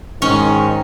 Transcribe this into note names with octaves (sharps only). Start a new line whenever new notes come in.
G#2 D#3 C#4